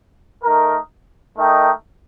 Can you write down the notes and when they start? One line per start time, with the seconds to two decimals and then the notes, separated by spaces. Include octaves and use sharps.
0.44 A3 D#4 A#4
1.37 A3 D#4 A#4 D#5 G5